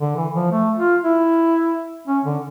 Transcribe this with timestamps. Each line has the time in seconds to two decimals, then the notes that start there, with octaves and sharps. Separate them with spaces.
0.01 D3
0.17 E3
0.35 F3
0.52 A3
0.78 F4
1.03 E4
2.07 C#4
2.25 D3